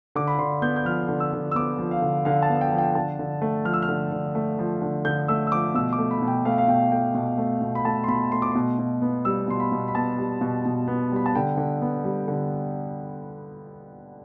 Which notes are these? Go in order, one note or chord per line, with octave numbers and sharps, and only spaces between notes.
D3 D6
B5
D3 C6
B3 G6
G6
F3 F6
D3
E6
D3
E6
B3 D6
F3
F5
D3
D3 F5
A5
B3
G5
F3
G5
D3 A5
D3
A3
F3 F6
E6
F6
D3
D3
A3
F3
D3
D3 G6
A3 E6
E6
F3 D6
B2 E6
D6
A3
B5
B2
G5
A3 F5
F5
B2 G5
A3 G5
B2
A3
B2
B5
A3 A5
C6
B2 B5
A3 C6
D6
B2 C6
B2
B3
G3 E6
B2 C6
B5
B2
B5
B3 A5
G3
B2
B2
B3
G3 B5
A5
D3 G5
D3
B3
G3
D3